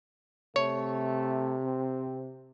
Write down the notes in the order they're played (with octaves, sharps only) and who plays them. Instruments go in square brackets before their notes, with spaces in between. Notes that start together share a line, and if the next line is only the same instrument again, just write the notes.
[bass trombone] C3 [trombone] A3 [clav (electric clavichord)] C#5
[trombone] C4